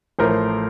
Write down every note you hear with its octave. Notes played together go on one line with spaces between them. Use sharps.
A1 A2 F3 A3 A#4 C5